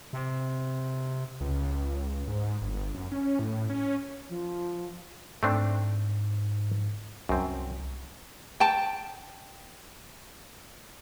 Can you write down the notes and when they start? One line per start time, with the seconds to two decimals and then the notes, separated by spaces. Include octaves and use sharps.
0.13 C3
1.41 C#2
2.28 G#2
2.61 G1
2.94 F#2
3.12 C#4
3.39 A2
3.70 C#4
4.29 F3
5.43 G#2 A3 C4 D4
7.29 C2 F#2 C4
8.60 G5 A5